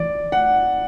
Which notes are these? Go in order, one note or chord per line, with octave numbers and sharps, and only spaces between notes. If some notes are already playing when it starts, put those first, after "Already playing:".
Already playing: E3 D5
F#5